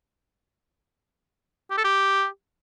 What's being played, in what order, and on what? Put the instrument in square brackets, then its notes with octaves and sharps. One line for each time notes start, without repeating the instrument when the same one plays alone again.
[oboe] G4
A4
G4